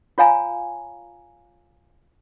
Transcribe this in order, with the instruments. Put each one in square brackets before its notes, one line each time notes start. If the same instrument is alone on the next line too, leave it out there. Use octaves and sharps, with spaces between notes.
[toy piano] F4 C#5 F5 G#5 A#5